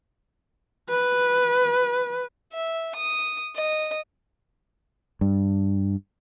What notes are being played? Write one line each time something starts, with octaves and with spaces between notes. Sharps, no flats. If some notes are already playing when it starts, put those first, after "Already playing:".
B4
E5
D#6
D#5
G2